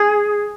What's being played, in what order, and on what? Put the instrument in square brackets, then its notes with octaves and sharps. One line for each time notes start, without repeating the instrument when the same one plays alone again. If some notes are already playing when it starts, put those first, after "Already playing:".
Already playing: [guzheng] G#4